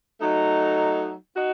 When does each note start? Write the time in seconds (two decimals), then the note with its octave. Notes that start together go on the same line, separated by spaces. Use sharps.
0.19 F#3 A3 D#4
1.36 D#4 F#4